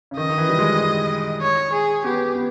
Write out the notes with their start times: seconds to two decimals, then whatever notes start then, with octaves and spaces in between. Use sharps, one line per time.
0.11 C#3
0.17 D#3 D#5
0.30 D#3
0.38 E3
0.49 G3
0.59 G#3
1.41 C#5
1.73 G#4
2.04 B3 G4
2.35 B3